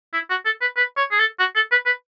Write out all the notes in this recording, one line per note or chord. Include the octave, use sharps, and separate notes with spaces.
E4
F#4
A4
B4
B4
C#5
G#4
A4
F#4
A4
B4
B4